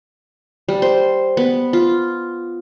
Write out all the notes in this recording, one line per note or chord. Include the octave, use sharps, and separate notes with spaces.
G3
C5
B3
F4